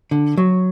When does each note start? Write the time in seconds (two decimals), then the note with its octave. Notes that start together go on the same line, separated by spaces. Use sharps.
0.11 D3
0.37 F#3